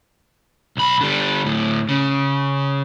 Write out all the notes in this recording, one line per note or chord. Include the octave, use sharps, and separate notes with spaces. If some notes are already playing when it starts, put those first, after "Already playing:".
B1 B5
D3 G3
D2 A2
C#3